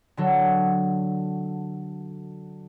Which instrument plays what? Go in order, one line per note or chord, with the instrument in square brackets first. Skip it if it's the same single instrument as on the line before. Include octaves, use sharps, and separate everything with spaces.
[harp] D3 F#3 A4